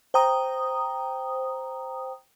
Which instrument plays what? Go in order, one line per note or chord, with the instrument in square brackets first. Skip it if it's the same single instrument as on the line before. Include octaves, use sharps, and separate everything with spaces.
[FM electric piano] C5 G5 A#5 D#6